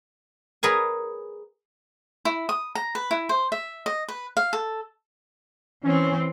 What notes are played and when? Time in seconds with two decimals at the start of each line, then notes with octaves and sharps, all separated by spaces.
0.63 G#4 A#4 B4 C#5 F#5 G#5
2.25 E4
2.49 D#6
2.75 A#5
2.95 B4
3.11 E4
3.29 C5
3.52 E5
3.86 D#5
4.08 B4
4.37 F5
4.53 A4
5.83 E3 C4 C#4 C#5